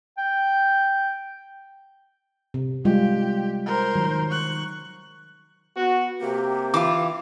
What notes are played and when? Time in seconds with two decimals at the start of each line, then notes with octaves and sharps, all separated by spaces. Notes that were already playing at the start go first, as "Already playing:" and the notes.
0.18 G5
2.54 C3
2.85 G3 G#3 F4 G4
3.66 A#4 C5
3.95 D#3 F#3
4.30 C#6 F#6
5.77 B3 F#4
6.21 C3 A#3 G4
6.74 E3 F4 D6